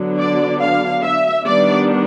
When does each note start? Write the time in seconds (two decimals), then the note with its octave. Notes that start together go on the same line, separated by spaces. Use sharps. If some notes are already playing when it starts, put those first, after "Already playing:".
Already playing: D3 F#3 B3 D4
0.19 D5
0.60 F5
1.03 E5
1.44 D#3 G3 B3 D4 D5